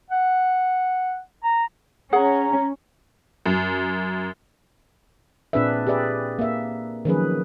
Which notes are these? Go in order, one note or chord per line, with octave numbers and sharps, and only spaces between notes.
F#5
A#5
C#4 G#4 F#5 A#5
F#2
A#2 C4 D4 G#4 B4 E5
G4 G#4 B4 D5 E5
A#3 E5
D#3 F3 F#3 C#4 G#4 B4